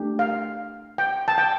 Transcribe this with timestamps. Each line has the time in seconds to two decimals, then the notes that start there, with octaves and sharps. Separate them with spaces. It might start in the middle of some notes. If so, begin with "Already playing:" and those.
Already playing: A3 D4 G4
0.19 F5
0.98 G5
1.28 A5
1.38 G5